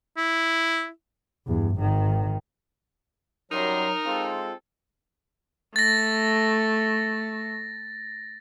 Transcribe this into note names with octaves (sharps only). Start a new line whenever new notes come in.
E4
E2 G2
G#1 D#3
F#2 F#3 G3 D#4 A#4 C6
G#3 C4 F4 A4
A3 A6 A#6